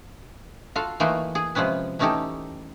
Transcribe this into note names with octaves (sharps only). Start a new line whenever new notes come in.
F4 F#4 A4 F5
E3 A3 A#3 D#4 F4 F#4
G#4
C3 F3 G#3 C#4 B4
E3 A3 C#4 D#4 G4 A4